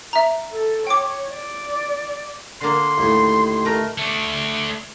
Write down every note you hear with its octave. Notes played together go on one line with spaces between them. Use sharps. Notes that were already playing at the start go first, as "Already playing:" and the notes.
E5 A#5
A4
C#5 G5 D6
D5
D3 A#3 C6
D#2 A2
A3 A#4
A3 D4